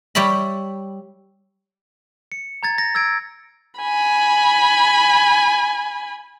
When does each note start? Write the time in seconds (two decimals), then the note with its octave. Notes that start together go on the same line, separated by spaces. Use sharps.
0.15 G3 G4 C#5 E5 B5
2.32 C#7
2.63 A#5 G#6 A6
2.78 A#6
2.95 E6 G#6 D7
3.80 G#5 B5